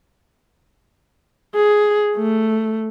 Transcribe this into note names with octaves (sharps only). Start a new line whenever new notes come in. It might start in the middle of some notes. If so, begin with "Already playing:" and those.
G#4
A3